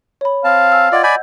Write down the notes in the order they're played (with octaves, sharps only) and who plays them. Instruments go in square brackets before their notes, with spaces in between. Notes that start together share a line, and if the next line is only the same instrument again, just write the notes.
[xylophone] C#5 B5
[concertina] C4 A5 [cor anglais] F5
[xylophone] G#5 E6
[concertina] F4 D5 [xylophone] D#5 F#5 G#6
[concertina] D5 G#5 B5 [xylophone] G6